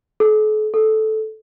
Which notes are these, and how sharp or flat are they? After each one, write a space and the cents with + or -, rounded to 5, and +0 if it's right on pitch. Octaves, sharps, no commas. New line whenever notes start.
A4 -45
A4 -10